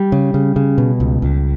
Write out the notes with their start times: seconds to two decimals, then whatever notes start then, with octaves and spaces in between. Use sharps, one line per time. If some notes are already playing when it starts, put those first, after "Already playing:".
Already playing: G3
0.12 C#3
0.34 C#3
0.56 C#3
0.78 B2
1.00 C#2
1.22 C#2